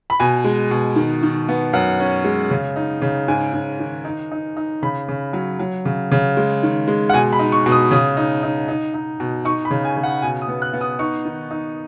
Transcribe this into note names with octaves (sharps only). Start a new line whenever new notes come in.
B5
B2 G#5
G#3
B2
D#3
D#3
B3
F#2 F#5
C#4
G#3
C#3
D#4
C#3
G#2 G#5
G#2
D#3
D#4
D#4
D#4
C#3 B5
C#3
F#3
F#3
C#3
C#3
G#3
D#3
G#3
F#5
B2 G#5
B5
D#4
C#6
B2
D#6
C#3 D#6
D#4
D#4
D#4
D#4
B2
D#4 C#6
B5
C#3
G#5
C#3
F#5
B2 G#5
D#6
B3
F#6
B3
D#6
D#4 C#6
D#3
D#4